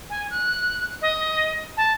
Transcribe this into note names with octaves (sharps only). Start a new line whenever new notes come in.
G#5
F#6
D#5
A5